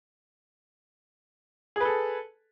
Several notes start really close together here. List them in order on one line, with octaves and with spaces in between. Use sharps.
G#4 B4 A4